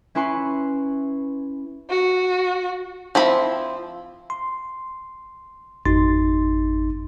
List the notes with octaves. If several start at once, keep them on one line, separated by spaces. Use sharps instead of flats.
C#4 E4 B4 G#5 C6 C#6
F#4
F3 C4 E4 B5
C6
G#1 F2 D#4 C6 A6